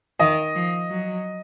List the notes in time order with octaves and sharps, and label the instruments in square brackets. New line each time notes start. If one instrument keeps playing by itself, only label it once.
[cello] D#3 [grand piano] D#5
[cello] F3
F#3